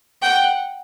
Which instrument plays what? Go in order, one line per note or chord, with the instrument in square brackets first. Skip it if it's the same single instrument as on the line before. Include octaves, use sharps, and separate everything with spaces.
[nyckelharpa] F#5 [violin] G5